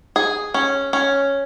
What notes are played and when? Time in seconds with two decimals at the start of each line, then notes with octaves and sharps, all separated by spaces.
0.16 G#4
0.54 C#4
0.93 C#4